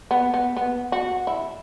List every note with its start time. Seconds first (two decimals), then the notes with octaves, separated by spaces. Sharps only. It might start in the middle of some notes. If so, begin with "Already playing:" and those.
0.11 B3
0.34 B3
0.57 B3
0.92 F#4
1.27 E4